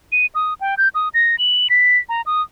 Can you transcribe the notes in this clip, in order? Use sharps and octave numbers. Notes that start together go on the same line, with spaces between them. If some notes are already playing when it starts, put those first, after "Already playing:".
D#7
D#6
G5
G6
D#6
A#6
F#7
B6
A#5
D#6